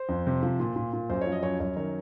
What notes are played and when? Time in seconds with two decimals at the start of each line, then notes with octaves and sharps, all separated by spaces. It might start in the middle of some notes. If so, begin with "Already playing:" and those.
Already playing: C5
0.09 F2
0.27 C3
0.43 F3
0.60 A#2
0.76 A#2
0.93 A#2
1.10 F#2 C5
1.21 F3 C#5
1.32 D#5
1.43 F#2 C#5
1.60 F#2 C#5
1.76 D#3 C#5